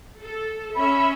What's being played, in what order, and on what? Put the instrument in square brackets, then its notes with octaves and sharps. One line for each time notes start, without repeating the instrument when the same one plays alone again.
[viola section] A4
[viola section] C#4 E5 [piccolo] B5